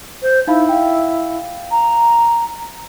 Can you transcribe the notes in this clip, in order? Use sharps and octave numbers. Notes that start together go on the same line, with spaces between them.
C5
D#4 E4 F5 B5
F5 G5
A#5